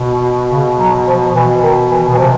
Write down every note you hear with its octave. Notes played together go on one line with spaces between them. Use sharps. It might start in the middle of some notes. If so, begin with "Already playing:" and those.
Already playing: B2
C#3
F#3
F3
B2 E3
D#3
E3
B2
E3
C3 F3